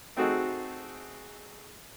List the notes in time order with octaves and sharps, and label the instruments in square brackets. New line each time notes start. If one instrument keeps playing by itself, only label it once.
[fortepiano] A3 C4 D#4 F#4 G#4 A4